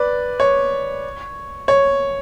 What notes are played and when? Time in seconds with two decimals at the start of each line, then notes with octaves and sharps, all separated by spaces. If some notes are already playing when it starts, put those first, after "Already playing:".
Already playing: B4 D5
0.40 C#5
1.68 C#5